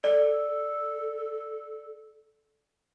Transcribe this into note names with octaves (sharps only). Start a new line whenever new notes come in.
A4 D5